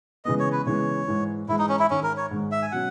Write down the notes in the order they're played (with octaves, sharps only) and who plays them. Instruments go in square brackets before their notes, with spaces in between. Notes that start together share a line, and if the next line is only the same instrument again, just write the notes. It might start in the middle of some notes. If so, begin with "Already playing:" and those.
[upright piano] C#3 E3 G#3 B3 [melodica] D#5
[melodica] C#5
B4
[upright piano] C#3 E3 G#3 B3 [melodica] C#5
[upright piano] G#2 E3 G#3
[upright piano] G#2 E3 G#3 [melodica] E4
[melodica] D#4
C#4
E4
[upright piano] G#2 D#3 G#3 [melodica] C#4
[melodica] A#4
C#5
[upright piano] G#2 D#3 G#3
[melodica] E5
G#5
[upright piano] B2 F#3 C#4 [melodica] F#5